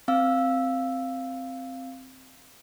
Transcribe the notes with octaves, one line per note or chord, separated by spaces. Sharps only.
C4 F5 E6